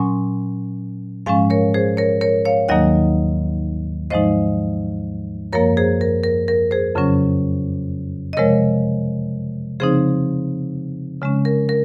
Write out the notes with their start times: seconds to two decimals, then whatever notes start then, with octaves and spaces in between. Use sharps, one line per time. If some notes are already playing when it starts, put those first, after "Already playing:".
Already playing: A#2 F#3 C#4 G#5 C6
1.26 G#2 F3 G#3 C#4 F5 G#5
1.50 A#4 C#5
1.74 G#4 C5
1.97 A#4 C#5
2.21 A#4 C#5
2.45 C#5 F5
2.69 D#2 D#3 F#3 A#3 D#4 D#5 F#5
4.10 G#2 F3 G#3 D#4 C5 D#5
5.53 F#2 F3 A#3 A#4 C#5
5.77 G#4 C5
6.01 A#4
6.24 A#4
6.48 A#4
6.71 G#4 C5
6.95 F2 C#3 F#3 C#4
8.33 D#5
8.37 C3 F3 G#3 A#4 C#5
9.80 C#3 F3 C4 D#4 G#4 C5
11.21 C#3 G#3 C#4
11.45 A#4
11.69 A#4